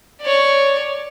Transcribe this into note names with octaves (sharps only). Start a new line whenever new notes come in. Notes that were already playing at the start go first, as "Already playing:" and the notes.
C#5 D5